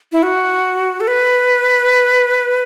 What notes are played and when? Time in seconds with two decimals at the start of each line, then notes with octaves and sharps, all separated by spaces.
0.12 E4
0.23 F#4
1.01 A4
1.08 B4